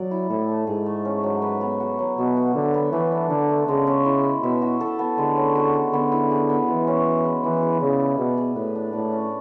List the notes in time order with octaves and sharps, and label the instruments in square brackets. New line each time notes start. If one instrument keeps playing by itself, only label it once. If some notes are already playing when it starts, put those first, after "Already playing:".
Already playing: [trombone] F#3 [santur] D5
[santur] E4
[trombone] A2 [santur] A4
[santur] A3
[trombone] G#2 [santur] G#4
[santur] A3
C#4
F#3
B4
B3
F#4
F#3
[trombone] B2 [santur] E5
[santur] F#4
[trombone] D3 [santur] B4
[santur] B3
[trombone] E3 [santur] A3
[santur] D4
[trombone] D3 [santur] A4
[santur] A3
[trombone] C#3 [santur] G#3
[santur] C#4
E4
G#3
[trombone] B2 [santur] E5
[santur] F#4
A4
B3
[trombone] D3 [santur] G#3
[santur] C#4
F#4
G#3
[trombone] D3 [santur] B3
[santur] E4
G#4
B3
[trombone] E3 [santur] G#3
[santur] C#4
F#4
G#3
[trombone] E3 [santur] E4
[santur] G#4
[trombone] C#3 [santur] D5
[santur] E4
[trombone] B2 [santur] D5
[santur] G#4
[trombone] A2 [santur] B4
[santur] D4
[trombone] A2 [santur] D5
[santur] C#4